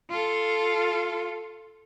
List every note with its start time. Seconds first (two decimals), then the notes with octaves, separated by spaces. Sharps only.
0.10 F4 A4